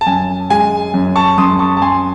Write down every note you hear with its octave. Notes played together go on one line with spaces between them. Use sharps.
A5
F#2 G#5
G#3 G#5
F#2
A5 C#6
F#2 C6 D#6
A5 C#6
A5
F#2 G#5 C6